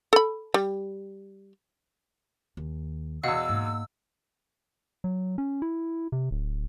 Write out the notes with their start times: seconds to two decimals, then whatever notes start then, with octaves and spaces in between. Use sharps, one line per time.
0.13 A4 B5
0.54 G3
2.57 D#2
3.23 E2 B2 D#5 F5 F#5 E6
3.49 G#2 A#3
5.04 F#3
5.38 C#4
5.62 E4
6.12 C3
6.31 D1